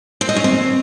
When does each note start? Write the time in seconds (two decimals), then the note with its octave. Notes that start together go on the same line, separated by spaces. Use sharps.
0.21 C4
0.29 D#5
0.36 C#4
0.44 C4